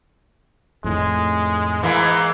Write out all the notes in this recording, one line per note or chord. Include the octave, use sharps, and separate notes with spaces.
F2 A2 D#3 G#3
G#2 E3 G#3 A#3